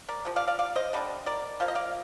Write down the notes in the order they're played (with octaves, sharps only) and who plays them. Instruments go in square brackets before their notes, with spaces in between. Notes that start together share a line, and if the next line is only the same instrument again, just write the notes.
[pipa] A#4 D5
C3 F3
D5 F5
D5 F5
D5 F5
C5 D#5
D3 G3 A#3 D4
A#4 D5
F3 A#3 F5
D#5
D5 F5